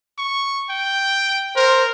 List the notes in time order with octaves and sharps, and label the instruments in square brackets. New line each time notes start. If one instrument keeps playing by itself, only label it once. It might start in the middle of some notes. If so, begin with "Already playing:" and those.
[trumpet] C#6
G5
[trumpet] A#4 [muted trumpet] C5